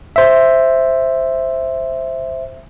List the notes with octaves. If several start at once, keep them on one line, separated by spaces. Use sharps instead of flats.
C5 E5